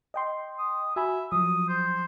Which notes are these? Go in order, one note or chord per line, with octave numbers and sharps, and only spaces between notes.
D#5 G5 C6
D#6
F#4 E5 G#5 B5
F3 F#3 D#6
C5